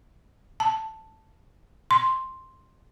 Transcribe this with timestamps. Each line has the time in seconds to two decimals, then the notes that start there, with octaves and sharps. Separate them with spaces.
0.60 A5
1.91 C6